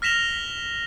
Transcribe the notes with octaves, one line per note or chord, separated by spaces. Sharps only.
F6 A#6 B6 E7 F7 G7